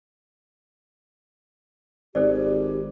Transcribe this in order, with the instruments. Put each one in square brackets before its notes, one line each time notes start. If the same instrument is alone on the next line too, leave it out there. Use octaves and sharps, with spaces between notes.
[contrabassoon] G#1 [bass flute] G4 [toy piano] A4 C5 D5